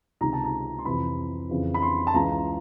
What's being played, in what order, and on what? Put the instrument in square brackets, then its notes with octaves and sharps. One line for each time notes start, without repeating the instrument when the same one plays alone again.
[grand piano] C#2 C3 D#3 A#5
A5
A#5
C6
F2 C3 E3 B5
F2 C#3 E3
B5
C6
A5
C#2 C#3 E3 A#5